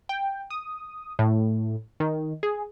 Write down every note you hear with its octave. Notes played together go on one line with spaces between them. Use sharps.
G5
D#6
A2
D#3
G#4